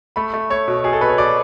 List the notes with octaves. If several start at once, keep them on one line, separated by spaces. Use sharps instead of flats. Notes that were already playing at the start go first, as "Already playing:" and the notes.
A3 B5
A3
A3 C#5
B2
B2 G#4
A4
B2 B4
C#5
B2 D5